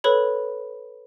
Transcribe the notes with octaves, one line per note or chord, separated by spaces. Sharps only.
A4 B4 C#5 B5